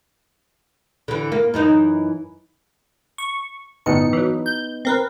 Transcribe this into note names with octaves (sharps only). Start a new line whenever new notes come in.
D3 E3
A#3
F#2 E3 D#4
C#6
G1 A2 B3 D#4 A5 C#7
E3 F#3
G6
C4 A#4 B4